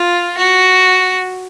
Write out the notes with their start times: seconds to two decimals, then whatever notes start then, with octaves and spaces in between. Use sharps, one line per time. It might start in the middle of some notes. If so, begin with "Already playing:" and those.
Already playing: F4
0.37 F#4